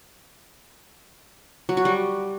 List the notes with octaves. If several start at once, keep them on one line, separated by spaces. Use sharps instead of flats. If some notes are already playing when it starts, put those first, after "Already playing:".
F#3
F#4
G3